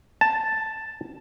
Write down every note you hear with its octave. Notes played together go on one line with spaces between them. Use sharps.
A5